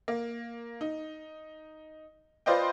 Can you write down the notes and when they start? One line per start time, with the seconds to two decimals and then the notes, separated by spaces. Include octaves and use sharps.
0.08 A#3
0.81 D#4
2.46 F4 B4 C5 D5 D#5 G5